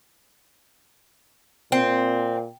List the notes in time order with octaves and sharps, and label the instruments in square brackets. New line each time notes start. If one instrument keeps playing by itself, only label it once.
[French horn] A#2 [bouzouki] C4